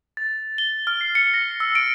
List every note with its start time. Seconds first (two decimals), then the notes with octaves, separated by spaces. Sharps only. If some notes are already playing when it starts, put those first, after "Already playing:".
0.17 A6
0.58 G7
0.87 F6
1.01 C7
1.15 C#7
1.34 A#6
1.60 E6
1.75 D7